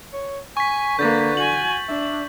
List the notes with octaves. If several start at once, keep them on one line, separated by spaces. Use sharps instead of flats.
C#5
G#5 C#6 B6
D3 A#3 B4 G6 A6
F#4 G#5 F#7
D4 E5